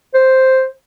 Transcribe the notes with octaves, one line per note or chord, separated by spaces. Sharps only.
C5